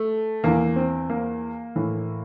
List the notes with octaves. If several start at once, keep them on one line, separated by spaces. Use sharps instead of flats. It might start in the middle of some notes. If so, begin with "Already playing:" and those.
Already playing: A3
E2 E3 A#3
C4
A#3
A2 E3